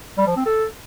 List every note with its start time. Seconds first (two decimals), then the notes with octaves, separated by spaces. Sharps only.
0.18 G3
0.27 F3
0.36 C4
0.46 A4